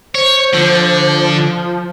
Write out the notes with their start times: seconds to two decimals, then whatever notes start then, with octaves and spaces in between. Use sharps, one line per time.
0.15 C5 C#5
0.54 D3 F3